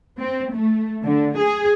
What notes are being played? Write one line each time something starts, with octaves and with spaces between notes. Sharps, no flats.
C4
A3
D3
G#4